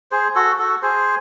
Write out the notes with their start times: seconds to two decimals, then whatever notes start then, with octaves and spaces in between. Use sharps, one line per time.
0.11 G#4 C5
0.35 F#4 A4
0.59 F#4 A4
0.82 G#4 C5